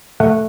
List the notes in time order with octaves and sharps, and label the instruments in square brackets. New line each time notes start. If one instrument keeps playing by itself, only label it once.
[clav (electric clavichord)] A3 F#5